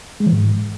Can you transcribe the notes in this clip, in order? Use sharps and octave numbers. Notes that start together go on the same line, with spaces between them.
G#3
E3
G#2